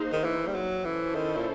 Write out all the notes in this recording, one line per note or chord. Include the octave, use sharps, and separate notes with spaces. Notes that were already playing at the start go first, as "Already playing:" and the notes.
Already playing: A#3 D#4 G#4 C5
D#3
E3
G3
F#3
E3 C#4 E4 A4 C5
D#3
A#2